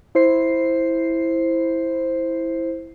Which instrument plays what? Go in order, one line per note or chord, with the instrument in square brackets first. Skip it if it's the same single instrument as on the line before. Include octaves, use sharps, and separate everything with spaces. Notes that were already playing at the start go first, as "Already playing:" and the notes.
[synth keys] E4 C5 C7